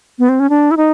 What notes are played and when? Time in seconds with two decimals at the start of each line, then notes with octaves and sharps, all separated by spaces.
0.19 B3
0.29 C4
0.40 C#4
0.50 D4
0.71 E4
0.77 D#4